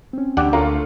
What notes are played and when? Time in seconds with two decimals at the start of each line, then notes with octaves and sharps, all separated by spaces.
0.13 C4 C#4
0.37 D2 D4 G4 D5 F#5
0.53 A3 A#3 C#4 F4